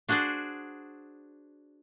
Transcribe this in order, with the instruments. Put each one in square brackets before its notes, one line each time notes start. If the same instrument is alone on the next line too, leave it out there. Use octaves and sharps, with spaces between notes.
[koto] D4 F#4 G#4 C5 D5